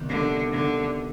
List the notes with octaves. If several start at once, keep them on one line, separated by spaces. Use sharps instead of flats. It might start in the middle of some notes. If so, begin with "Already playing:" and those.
Already playing: C3 D#3 G3 B3
D3
D3